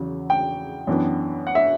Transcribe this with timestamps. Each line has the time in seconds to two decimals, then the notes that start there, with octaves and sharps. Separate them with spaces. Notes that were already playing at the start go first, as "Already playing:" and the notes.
Already playing: E2 C#3 F#3
0.30 G5
0.87 F#2 E3 B3 D4
1.47 F#5
1.55 E5